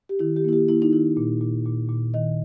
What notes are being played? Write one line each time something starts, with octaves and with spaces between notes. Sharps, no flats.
G4
D#3 E4
G4
A#3 E4
G4
A#3 E4
D#4
D#3 E4
A#2
A#2
A#2
A#2
D#3 D#5